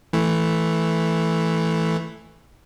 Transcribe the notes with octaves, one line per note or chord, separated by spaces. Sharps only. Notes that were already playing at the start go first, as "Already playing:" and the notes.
E3 A3